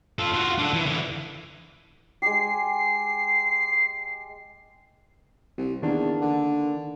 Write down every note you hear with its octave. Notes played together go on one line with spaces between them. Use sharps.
F4 A4
F4 F#4
D4 A4
E3
D3 E3
G#3 G4 C7
C2
E2 D#3 A#3 D4
D3